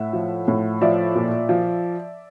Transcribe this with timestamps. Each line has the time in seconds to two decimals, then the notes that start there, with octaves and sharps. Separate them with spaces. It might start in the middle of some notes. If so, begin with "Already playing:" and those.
Already playing: A2 E5 F#5
0.13 F3
0.48 A2
0.81 F3 D5 E5
1.15 A#2
1.49 F3